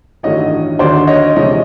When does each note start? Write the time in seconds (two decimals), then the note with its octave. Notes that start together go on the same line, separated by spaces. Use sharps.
0.23 A1 G2 D#3 F#3 A3 C#5 D#5
0.79 D#2 D3 F#3 C5 D5
1.07 C#5 D#5
1.35 E2 C3 F3 G#3 C#5 D#5